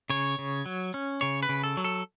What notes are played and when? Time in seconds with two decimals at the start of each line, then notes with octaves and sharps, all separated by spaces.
0.10 C#3 C#5
0.39 C#3
0.66 F#3
0.94 C#4
1.21 C#3 C#5
1.43 B4
1.49 C#3
1.64 A4
1.77 F#3
1.84 A4